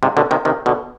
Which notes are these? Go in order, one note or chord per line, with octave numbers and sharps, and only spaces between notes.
G#2 C3
B2 D3
C3 D#3
C3 D#3
B2 D3